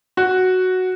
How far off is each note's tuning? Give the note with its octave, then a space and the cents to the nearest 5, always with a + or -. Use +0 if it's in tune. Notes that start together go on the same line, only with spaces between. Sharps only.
F#4 +0